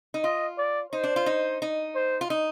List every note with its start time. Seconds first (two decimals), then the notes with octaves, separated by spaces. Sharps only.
0.14 D#4
0.23 F4 D#5
0.58 D5
0.92 D#4 C5
1.04 D4
1.16 F4
1.26 D#4
1.62 D#4
1.95 C5
2.21 F4
2.30 D#4